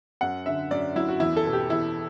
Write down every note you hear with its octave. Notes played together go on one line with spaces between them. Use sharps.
F#2 F#5
D3 E5
F#2 D5
F#3 E4
F#4
E2 E4
A4
B2
G4
E2 E4